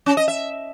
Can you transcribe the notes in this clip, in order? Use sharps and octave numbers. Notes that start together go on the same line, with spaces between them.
C#4
D#5
E5